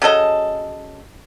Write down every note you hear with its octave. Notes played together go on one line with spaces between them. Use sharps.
C#3 F#3 A4 D#5